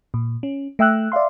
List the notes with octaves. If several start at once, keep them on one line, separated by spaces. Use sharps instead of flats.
A#2
C#4
A3 E5 G5 E6 F#6
D5 E5 F5 C6